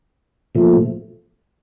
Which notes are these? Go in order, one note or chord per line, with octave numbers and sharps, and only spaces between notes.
A#2 F3 A3